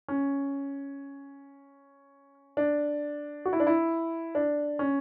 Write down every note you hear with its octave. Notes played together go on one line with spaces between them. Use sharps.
C#4
D4
F#4
E4
D4
E4
D4
C#4